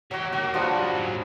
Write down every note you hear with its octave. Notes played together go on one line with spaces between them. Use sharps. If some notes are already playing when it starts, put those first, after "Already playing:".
F#3 F#4 G4 C#5
A#3 F#4 G4
F3 G3 D4 F#4 G#4
G#2 F#3